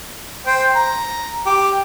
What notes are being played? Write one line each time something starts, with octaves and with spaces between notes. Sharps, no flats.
C5 G5
A#5
G4